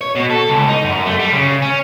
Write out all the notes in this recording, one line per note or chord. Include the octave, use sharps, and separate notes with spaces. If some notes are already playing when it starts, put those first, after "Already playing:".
C#5
B2
A4
C#2
D#4
F#2
A3
G3
C#3
C#4